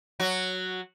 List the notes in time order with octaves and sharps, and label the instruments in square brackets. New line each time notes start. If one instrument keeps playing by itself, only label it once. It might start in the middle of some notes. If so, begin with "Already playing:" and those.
[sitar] F#3 F#4